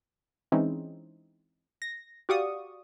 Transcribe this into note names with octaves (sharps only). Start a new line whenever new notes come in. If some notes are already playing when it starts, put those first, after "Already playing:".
E3 G#3 C4 C#4 D#4
A#6
F#4 G4 D5 F5 C#6 D#6